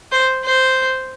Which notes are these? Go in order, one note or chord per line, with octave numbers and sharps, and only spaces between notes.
C5
C5